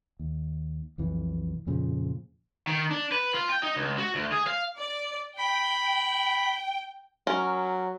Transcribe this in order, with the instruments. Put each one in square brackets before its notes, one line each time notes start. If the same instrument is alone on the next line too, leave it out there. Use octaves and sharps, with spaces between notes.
[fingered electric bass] D#2
B1 F2 E3
F2 A#2 C#3 F3
[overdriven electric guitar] D#3
D4
B4
F4
G5
D#4
C#2
F#4
D2
G#4
F5
[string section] D5
[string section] G5 [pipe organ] B5
[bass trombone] F#3 [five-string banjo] C#4 A#4